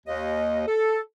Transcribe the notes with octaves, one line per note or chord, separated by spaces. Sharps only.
D#2 D#5
A4